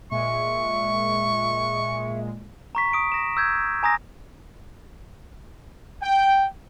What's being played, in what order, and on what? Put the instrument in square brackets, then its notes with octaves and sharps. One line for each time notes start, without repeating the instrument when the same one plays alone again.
[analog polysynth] A#2 G#3 [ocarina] E5 [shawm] C#6
[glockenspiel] A#5 C#6 B6
D#6 D7
A#6 E7
E6 G6 G#6
G#5 A#5 D#6 A#6
[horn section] G5